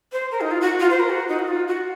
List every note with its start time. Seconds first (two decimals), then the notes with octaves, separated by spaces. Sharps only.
0.13 C5
0.31 A#4
0.41 D#4
0.51 F4
0.61 F#4
0.80 F4
0.90 C5
1.00 A#4
1.10 F#4
1.28 D#4
1.39 F#4
1.48 F4
1.68 F#4